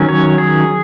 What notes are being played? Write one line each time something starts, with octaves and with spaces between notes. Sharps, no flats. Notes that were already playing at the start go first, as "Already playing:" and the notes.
Already playing: D#3 F#3 C#4
C#5
G#4